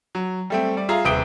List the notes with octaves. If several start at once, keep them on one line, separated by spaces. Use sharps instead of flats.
F#3
G3 A3 C4
G3 D5
F4 G#4 E5 F5 A#5
D#1 C3 B4 D#6 D7 G7